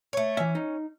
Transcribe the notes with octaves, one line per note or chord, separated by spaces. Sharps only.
A3 C#5
E3 C#4 E5
D#4